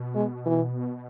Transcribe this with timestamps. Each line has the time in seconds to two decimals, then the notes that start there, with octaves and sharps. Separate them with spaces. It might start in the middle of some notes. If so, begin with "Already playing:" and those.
Already playing: B2
0.15 G#3
0.46 E3